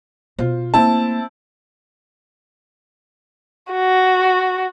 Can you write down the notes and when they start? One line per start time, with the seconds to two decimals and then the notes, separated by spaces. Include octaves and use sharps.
0.39 B2 F4 C5
0.74 A3 A#3 C4 E4 A5
3.73 F#4